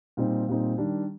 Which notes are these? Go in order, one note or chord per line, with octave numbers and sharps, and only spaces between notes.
A#2 G3 C4 D#4
A#2 G3 C4 D#4
D#3 G3 D4